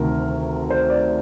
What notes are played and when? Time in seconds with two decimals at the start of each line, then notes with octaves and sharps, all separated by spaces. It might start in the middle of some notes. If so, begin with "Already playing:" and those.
Already playing: D2 C3 D#3 A#4
0.70 C5
0.90 D5